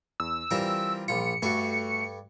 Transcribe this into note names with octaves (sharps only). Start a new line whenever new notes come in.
E2 E6
E3 G3 C4 F4 A#4
A#1 F4 C#7
G2 A3 F#4 A4 C#6